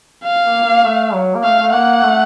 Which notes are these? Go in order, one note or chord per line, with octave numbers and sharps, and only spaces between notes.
F5
A#3
A#3
A3
F#3
A#3
A3 F5
A3
A#3 F#5
A3